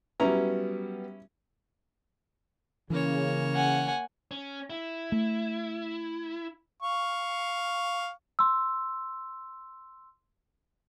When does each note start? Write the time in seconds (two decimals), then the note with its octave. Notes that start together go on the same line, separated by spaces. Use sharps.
0.20 F#3 G3 B3 C#4 E4 A#5
2.90 C#3 E3 A#3 C#5
3.55 F#5 G#5
4.31 C#4
4.70 E4
5.12 A3
6.82 F5 C#6
8.39 C6 E6